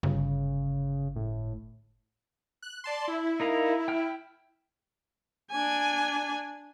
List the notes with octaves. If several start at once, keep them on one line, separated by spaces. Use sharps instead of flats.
G1 C#3
A2
F#6
D5 A5 C6
E4
D#4 A#4 F5
G5 F6
D4 G#5